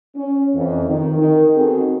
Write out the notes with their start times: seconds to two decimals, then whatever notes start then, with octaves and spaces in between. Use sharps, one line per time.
0.16 C#4
0.55 F2 E3
0.87 D#3
1.17 D#3
1.57 B3 C4 D#4 F#4 G#4 A4